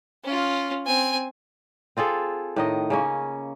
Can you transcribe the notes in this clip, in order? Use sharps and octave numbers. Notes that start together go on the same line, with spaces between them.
C#4 F4
C4 G#5
C4 F4 G#4 A4
A2 D#3 D#5
C#3 A#3 C#4